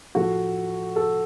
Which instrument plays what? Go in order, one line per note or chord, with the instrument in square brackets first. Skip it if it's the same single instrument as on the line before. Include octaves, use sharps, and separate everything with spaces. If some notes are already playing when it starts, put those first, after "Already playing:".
[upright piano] A2 F3 A3 F#4
A4